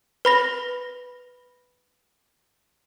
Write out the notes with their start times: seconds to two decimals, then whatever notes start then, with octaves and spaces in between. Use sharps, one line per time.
0.25 B4 B5 A#6